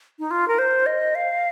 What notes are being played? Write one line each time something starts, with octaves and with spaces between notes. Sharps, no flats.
D#4
F4
A#4
C5
D#5
F5